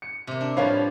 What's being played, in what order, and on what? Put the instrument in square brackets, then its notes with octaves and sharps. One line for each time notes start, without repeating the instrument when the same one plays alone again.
[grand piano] C#7
[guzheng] C3 A#3
D4
[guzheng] A2 F3 G3 [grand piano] B4 C#5 F5